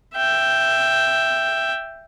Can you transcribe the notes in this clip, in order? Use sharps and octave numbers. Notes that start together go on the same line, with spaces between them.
E5 G5